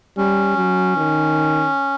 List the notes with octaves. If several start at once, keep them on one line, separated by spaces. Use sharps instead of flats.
G3 C#4
F#3
D#3